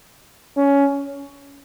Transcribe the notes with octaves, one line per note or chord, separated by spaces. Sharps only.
C#4